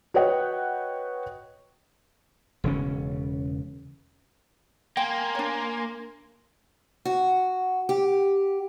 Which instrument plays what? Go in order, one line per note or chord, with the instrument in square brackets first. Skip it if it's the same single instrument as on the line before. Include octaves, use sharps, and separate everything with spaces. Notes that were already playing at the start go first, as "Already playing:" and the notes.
[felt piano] F#4 B4 C#5 D#5 F#5 G5
[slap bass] E1 C#3 C#4
[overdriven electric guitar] A#3 [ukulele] G5 [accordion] G#5 C6
[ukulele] D4 C#5
[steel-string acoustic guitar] F#4
G4